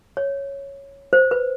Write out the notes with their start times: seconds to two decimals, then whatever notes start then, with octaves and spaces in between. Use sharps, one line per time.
0.17 C#5
1.13 C5
1.31 B4